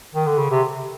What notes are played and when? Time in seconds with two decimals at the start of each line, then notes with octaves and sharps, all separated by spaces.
0.15 D#3
0.26 D3
0.38 C#3
0.51 C3